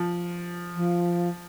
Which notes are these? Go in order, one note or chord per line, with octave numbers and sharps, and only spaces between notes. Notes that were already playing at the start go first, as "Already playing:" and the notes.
Already playing: F3
F3